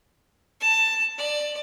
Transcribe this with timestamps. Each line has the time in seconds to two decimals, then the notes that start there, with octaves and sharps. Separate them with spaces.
0.60 A5
1.18 D5